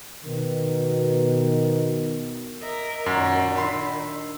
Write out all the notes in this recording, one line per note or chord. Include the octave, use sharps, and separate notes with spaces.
B2 D#3
A#4 D#5 E5
F#2 A#2 D#3 F#5
D4 B5 C6 E6